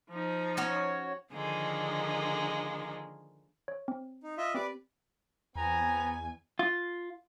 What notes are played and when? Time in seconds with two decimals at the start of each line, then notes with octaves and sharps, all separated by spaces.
0.10 F3 D#4
0.57 C#4 F#4 C#5
1.32 D3 D#3 F3 G#3 A#3
3.68 C#5
3.88 C4
4.23 D#4
4.37 F4 D#5 E5
4.54 C4 G4 B4 D5
5.55 E2 B3 C4 G#5 A#5
6.59 F4